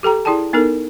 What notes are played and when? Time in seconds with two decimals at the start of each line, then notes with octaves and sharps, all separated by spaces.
0.03 G4 A4 G5 A#5
0.25 E4 G#4 D5 G5 A5
0.53 B3 D#4 A4 A#4